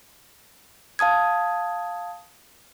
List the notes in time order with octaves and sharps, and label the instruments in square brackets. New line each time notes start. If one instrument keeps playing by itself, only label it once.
[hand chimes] F5 A5 D#6 G#6